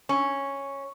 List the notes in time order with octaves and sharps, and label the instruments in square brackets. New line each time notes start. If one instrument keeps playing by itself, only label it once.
[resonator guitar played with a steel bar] C#4 [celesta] C#6